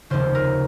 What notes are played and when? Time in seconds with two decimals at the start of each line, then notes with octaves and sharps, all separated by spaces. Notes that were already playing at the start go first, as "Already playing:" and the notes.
0.10 F1 D#2 C#3 C5
0.35 A#4